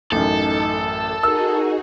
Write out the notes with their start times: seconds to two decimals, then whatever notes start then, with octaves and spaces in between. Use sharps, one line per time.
0.12 A1 F#2 D#4 A4
1.23 D#4 F#4 G#4 A#4 E6